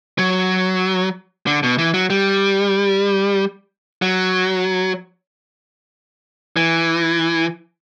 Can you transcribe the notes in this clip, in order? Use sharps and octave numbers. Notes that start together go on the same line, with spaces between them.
F#3
D3
B2
E3
F#3
G3
F#3
E3